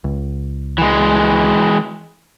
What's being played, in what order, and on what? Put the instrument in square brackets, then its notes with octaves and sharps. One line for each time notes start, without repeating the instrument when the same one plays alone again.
[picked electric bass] C#2
[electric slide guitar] E3 G#3